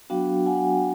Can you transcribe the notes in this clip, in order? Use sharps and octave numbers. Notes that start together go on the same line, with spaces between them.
F#3 B3 D4 F#4 F5 G5
F#5 G#5